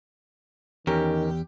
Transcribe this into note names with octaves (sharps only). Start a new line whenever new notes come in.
E2 D#3 C#4 G4 A#4